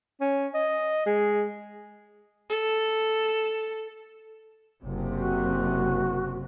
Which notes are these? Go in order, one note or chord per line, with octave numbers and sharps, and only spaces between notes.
C#4
D#5
G#3
A4
F#1 C3
F#4